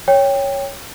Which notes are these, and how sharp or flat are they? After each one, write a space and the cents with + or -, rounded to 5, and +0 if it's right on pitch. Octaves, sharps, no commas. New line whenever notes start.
C#5 +0 G5 +15